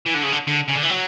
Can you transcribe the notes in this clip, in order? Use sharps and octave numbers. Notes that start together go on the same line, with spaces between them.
E3
D3
C#3
D3
D3
C#3
D3
E3
F#3